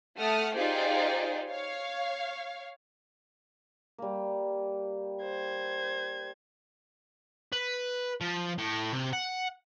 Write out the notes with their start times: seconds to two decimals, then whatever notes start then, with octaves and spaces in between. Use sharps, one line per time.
0.18 A3 F#5 A5 D#6 F6
0.54 D#4 F4 G4 G#4 C5 D5
1.50 C#5 F5
3.98 G3 A#3
5.23 C5 G#6
7.53 B4
8.21 F3
8.58 A2
8.93 C3
9.13 F#5